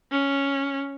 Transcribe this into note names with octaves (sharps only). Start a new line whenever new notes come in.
C#4